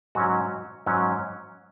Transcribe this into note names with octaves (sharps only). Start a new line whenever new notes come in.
G#2 F#3 C#4 F#4
G#2 F#3 C#4